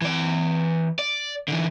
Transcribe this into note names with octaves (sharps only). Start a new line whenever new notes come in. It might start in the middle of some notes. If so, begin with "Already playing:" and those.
E3 D5
D5
D3 E3